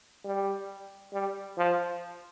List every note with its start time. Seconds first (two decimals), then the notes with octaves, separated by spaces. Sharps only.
0.25 G3
1.13 G3
1.58 F3